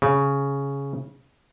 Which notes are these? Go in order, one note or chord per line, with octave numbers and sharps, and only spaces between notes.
C#3